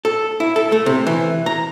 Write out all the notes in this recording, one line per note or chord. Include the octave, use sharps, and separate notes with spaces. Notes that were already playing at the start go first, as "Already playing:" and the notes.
A4
E4
A4
A3
C3
E3
A#5